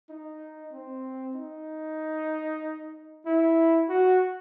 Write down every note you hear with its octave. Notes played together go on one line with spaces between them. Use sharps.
D#4
C4
D#4
E4
F#4